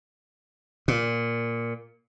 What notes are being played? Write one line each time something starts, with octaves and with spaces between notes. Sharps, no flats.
A#2